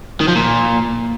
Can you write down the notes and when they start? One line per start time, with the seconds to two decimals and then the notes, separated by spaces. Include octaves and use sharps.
0.20 D#3
0.28 F3
0.35 A#2